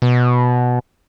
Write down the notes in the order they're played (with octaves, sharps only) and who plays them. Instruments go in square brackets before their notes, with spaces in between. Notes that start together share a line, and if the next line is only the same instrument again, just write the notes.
[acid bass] B2